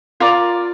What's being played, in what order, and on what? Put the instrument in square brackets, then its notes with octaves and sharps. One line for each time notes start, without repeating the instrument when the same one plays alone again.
[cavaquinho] F4 A#4 D5 A#5